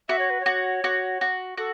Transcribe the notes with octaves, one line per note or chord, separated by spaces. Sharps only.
F#4 E5
C#5
B4
C#5
F#4
F#4
F#4
F#4 A4